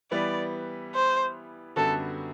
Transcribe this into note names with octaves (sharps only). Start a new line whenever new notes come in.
E3 G3 B3 E4 B4 D5
C5
F#2 D3 G3 B3 F#4 A4